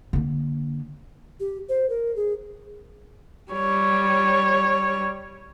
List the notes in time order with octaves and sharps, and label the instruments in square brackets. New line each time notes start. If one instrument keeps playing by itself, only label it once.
[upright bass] D3 A#3
[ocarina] G4
C5
A#4
G#4
[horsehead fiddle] G3 C#5